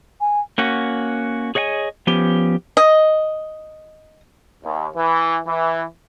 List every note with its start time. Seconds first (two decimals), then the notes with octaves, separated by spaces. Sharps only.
0.21 G#5
0.58 A#3 C#4 F#4
1.55 G#4 C#5 D#5 F#5 G#5
2.07 F3 B3 C#4 G4
2.77 D#5
4.64 D#2
4.96 E3
5.46 E3